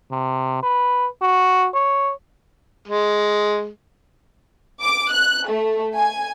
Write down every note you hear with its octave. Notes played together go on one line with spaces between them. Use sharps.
C3
B4
F#4
C#5
G#3
D6
F#6
A3
G#5